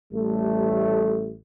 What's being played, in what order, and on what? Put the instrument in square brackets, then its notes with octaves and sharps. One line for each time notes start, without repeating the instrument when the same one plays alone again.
[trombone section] A1 G3 A3